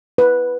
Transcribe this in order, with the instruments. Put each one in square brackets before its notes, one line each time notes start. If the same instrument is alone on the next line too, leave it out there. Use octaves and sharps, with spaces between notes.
[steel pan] B4